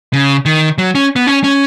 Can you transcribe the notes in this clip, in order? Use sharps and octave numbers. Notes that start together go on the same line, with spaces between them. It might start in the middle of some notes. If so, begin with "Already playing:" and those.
C#3
D#3
F#3
C#4
B3
C#4
C#4